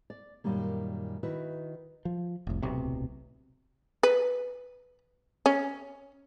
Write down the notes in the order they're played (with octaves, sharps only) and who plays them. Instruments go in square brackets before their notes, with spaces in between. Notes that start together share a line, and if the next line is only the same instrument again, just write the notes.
[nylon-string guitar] D5
F#2 A#2 D#3 G3 A#3
D#3 E4 F#4 B4
[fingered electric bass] F3
F1 C2
D1 B1 C3
[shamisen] B4
C#4